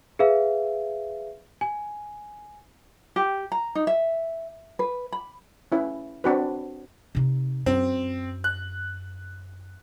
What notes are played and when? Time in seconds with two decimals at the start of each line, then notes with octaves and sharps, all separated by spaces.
0.19 G#4 B4 E5 F5
1.61 G#5
3.16 G4
3.52 A#5
3.75 D#4
3.87 E5
4.79 B4
5.12 B5
5.72 C#4 E4 B4
6.24 C4 D4 F#4 B4
7.15 C3 D#4
7.66 F#2 C4
8.44 F#6